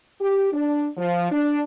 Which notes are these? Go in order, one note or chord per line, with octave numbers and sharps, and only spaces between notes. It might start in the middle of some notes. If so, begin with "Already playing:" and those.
G4
D4
F3
D4